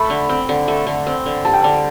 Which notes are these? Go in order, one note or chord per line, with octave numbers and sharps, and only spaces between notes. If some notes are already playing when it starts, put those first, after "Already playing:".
Already playing: A3 B5
D3
C4
D3
A3
D3
C4
D3
G3 A5
G5
D3 A5